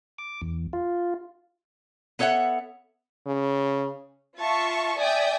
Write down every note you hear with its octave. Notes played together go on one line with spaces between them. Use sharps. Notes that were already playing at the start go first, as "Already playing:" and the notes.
D6
E2
F4
B3 A4 C#5 E5 F#5
C#3
F4 E5 A5 C#6
D5 E5 G5 G#5 D#6